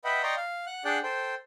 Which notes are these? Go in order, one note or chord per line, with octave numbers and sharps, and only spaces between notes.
B4 D#5 E5 F#5 G5 B5
D5 D#5 G5 A#5 C6 C#6
F5
F#5 F#6
D4 G#4 D5 F#5 G5 F#6
A4 C5 G5